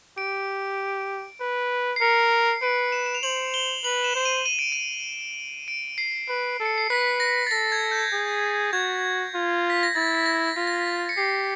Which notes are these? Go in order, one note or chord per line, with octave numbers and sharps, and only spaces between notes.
G4 D7
B4
C7
A#4 C#7
C#7
B4 D7
E7
E7
F7
C5 F#7
G7
B4 F#7
E7
C5
D#7
D#7
D7
D#7
D7
C7
B4
A4
C#7
C7
B4 B6
A#6
A6
A4 A#6
G#6
G6
G#4
F#4 G#6
F4
B6
A#6
E4 A6
B6
A#6
F4 B6
A#6
B6
C#7
G4 C7